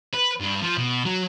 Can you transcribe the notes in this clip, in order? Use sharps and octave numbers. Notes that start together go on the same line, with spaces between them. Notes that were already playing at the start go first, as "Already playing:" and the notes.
B4
G2
F3
B2
F#3